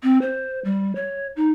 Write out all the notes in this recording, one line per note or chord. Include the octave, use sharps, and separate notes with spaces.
C4
C5
G3
C#5
D#4